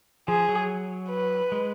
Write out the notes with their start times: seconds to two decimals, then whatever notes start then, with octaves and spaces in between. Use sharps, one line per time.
0.28 F3 G#4
0.49 F#3
1.10 B4
1.52 G#3